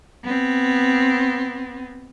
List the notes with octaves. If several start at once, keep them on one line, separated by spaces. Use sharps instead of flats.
B3 C4